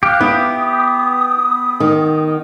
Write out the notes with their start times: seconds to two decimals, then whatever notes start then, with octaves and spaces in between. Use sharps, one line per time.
0.03 G4 F5 F6 F#6
0.21 B3 E4 G4 D#6
1.80 D#3